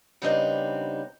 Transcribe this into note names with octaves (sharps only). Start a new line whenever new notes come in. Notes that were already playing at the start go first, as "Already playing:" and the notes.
C#3 G3 B3 C4 D4 D#4